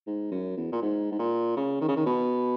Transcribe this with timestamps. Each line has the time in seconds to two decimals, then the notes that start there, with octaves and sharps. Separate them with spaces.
0.07 G#2
0.32 F#2
0.57 E2
0.72 A#2
0.82 G#2
1.12 G#2
1.19 A#2
1.57 C#3
1.81 D#3
1.88 C#3
1.96 D#3
2.06 B2